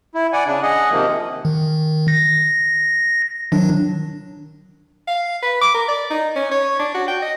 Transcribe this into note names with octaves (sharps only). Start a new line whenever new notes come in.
E4
D5 F#5 G#5
C#3 D4
G#4 D#5 F#5
C3 D#3 F3 A#3
D#3
A#6
D#3 F#3 D4
F5
B4
D6
A#4
D5
D#4
C#4
C#5
D4
F#4
G5
D#5